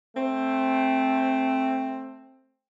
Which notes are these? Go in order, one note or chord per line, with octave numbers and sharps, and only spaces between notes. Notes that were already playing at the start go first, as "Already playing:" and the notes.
A3 C4